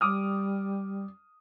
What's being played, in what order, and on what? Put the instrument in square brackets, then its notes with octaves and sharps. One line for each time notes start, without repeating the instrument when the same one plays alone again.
[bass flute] G3 [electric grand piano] D6 D#6 F6